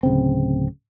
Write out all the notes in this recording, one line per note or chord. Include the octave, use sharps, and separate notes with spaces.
D1 C#3 C4